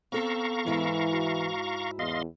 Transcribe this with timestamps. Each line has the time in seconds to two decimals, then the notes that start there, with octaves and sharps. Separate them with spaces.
0.12 B3 C4 A4 F5 A#5 C#6
0.66 G#2 E3 E4
1.12 F#4
1.99 E2 D#5 F5 C6